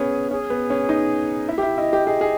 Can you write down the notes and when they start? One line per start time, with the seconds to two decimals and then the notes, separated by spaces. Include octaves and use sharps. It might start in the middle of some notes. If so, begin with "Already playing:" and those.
Already playing: B3 C#4 G#4
0.31 C#4 G#4
0.50 B3
0.70 C#4
0.89 D#4
1.49 E4 E5
1.58 G4
1.63 E4
1.78 E4 D#5
1.93 G4
2.07 G#4 D#5
2.21 G#4